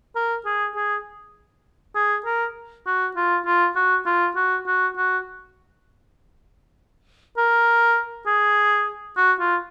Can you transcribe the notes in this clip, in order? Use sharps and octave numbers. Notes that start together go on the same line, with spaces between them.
A#4
G#4
G#4
G#4
A#4
F#4
F4
F4
F#4
F4
F#4
F#4
F#4
A#4
G#4
F#4
F4